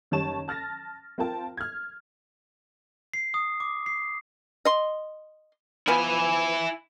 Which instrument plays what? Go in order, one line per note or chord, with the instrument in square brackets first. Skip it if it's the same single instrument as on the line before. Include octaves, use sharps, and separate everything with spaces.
[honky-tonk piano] F#1 D#3 G3 C#5 A5 E7
A5 F6 A6 A#6
C4 F4 A#4 G5 A5
F6 G#6
[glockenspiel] C7
D#6
D6
C7
[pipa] D#5 C6
[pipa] F3 B3 [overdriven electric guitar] E4 G#5